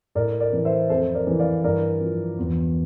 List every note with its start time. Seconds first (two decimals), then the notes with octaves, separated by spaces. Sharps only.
0.15 A2 A#4 D5
0.40 A#4 D5
0.53 E3
0.65 C5 E5
0.89 F2 A4 C5
1.15 A#4 D5
1.27 E3
1.40 D5 F5
1.64 G2 A#4 D5
2.01 F3
2.38 E2